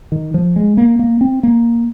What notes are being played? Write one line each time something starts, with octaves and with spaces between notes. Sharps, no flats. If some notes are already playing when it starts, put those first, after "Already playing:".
D#3
F3
G#3
A#3
A#3
C4
A#3